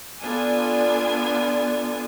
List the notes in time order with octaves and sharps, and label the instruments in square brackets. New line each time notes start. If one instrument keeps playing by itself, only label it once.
[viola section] B3 D4 F4 A4 D5 G#5